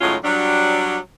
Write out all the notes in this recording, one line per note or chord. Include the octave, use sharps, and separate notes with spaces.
A2 D#3 F#3 G#3 C#4 F4
F#3 G3 D4